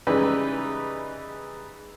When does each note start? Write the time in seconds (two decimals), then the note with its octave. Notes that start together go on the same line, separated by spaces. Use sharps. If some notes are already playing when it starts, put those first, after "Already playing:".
0.07 C#3 E3 G3 G#3 D#4 B4